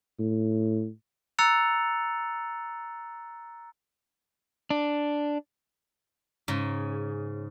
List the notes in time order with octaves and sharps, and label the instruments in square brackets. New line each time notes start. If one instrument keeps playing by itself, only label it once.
[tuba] A2
[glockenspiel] A#5 E6 F#6 A6 C#7 F7
[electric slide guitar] D4
[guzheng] G#2 C#3